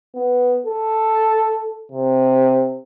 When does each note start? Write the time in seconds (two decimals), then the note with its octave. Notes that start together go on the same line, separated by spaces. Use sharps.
0.15 B3
0.67 A4
1.92 C3